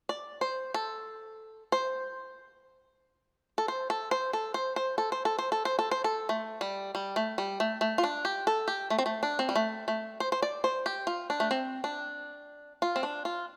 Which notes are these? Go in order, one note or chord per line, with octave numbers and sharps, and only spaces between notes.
D5
C5
A4
C5
A4
C5
A4
C5
A4
C5
C5
A4
C5
A4
C5
A4
C5
A4
C5
A4
A3
G3
G3
A3
G3
A3
A3
F4
D4
G4
A4
G4
A3
C4
A3
D4
C4
G3
A3
A3
C5
C5
D5
C5
G4
F4
D4
A3
C4
D4
F4
C4
D4
F4